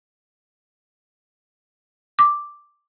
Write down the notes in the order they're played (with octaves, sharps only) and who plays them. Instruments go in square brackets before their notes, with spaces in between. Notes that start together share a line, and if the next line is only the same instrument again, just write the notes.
[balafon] D6